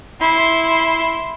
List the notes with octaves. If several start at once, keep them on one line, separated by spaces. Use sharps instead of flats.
E4 C6